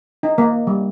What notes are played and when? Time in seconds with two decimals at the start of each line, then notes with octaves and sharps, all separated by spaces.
0.23 D#4
0.38 A#3
0.67 G3